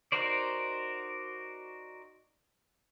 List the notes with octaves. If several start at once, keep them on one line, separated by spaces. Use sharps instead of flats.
D#4 F#4 A#4 C5 D5